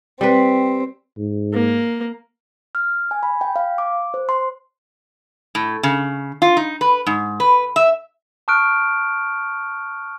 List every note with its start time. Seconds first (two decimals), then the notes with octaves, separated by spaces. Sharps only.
0.21 G3 C4 B4
1.17 G#2
1.53 A#3
2.75 F6
3.11 G#5
3.23 B5
3.41 G5
3.56 F5
3.78 D6
4.14 C5
4.29 C6
5.55 A2
5.83 C#3
6.42 F4
6.57 D#4
6.81 B4
7.07 G#2
7.40 B4
7.76 E5
8.48 A5 C#6 D#6 F6 F#6 D7